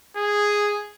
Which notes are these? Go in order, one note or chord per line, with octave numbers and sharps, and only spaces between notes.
G#4